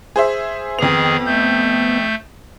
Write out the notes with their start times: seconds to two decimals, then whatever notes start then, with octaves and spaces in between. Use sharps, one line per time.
0.16 G#4 C5 E5
0.79 F2 D#3 B3 G#4 F7
1.26 A3 G6